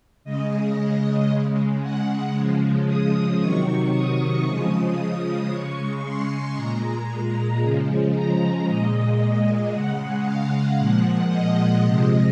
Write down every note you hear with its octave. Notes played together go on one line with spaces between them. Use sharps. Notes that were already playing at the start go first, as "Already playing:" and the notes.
C#3 G#3 D#5
C#3 G#3
F#5
C#3 F3 G#3
D#6
C3 D#3 F#3 C#6
D#6
C#3 F3 G#3 D#6
D#6
C#3 G#3 C#6
C6
A#2 G#3 A#5
C#3 F3 G#3
A#5
A#2 G#3 D#5
C#3 G#3 F#5
F5
A#2 F3 G#3 F#5
D#5
C3 F3 G#3